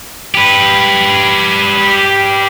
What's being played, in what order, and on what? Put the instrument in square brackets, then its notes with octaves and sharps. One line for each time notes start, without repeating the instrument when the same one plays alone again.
[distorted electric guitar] G4 B4